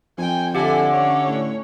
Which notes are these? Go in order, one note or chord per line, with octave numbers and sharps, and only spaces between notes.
F2 G5 G#5
D3 G4 A4 E5 G#5
C#4 C#5
A2